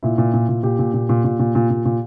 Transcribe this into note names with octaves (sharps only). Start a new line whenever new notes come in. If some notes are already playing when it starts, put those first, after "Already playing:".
A#2 E4
A#2
A#2
A#2
A#2 G4
A#2
A#2
A#2
A#2
A#2
A#2
A#2
A#2